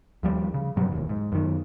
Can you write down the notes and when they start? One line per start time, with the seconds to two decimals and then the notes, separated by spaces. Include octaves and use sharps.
0.23 D#2 F3 G3
0.54 C#3
0.76 G2 B2 F#3 G3
0.92 E1 D#2
1.09 G#2
1.32 F#2 D#3